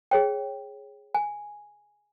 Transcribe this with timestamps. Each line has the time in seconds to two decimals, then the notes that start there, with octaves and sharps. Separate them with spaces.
0.11 G#4 C#5 G5
1.14 G#5